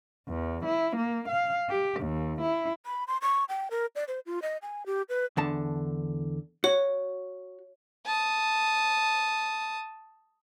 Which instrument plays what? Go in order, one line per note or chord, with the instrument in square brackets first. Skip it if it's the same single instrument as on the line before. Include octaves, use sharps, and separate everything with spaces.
[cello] E2
E4
A#3
F5
G4
D#2
E4
[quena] B5
C6
C#6
G5
A#4
D5
C5
F4
D#5
G#5
G4
B4
[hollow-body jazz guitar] E2 D3 A5
[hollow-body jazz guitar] F#4 [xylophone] C#5
[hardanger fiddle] A5 D#6